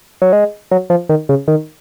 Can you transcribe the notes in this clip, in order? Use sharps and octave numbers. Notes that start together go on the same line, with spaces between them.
F#3
G#3
F#3
F3
D#3
C#3
D#3